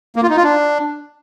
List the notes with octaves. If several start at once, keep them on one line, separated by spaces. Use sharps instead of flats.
A#3
F4
D#4
F4
D4